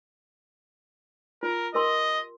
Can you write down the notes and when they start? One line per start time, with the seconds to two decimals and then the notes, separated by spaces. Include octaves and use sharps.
1.43 F4 A#4
1.74 G4 A#4 D#5 C6